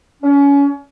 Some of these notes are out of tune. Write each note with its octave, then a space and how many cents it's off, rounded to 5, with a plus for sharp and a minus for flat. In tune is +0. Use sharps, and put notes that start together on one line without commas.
C#4 +30